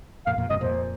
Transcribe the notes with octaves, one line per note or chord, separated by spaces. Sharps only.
F2 A#2 F5
F2 A#2
G2 C3 D#5
F2 A#2 C5